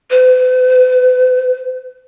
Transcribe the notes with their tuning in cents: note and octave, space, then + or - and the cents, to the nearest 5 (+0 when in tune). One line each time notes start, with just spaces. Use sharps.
B4 +45